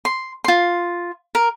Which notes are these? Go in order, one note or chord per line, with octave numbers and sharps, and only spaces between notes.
C6
F4 C6
A#4